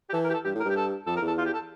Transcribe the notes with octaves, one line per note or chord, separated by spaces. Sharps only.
G4
E3 A4
A#4
G4
A4
G2 G4
A2
A#4
G2 G4
A4
F2 A4
A#4
E2
A4
F4
G4
A4